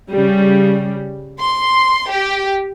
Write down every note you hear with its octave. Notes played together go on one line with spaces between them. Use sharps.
C#3 G3
C6
G4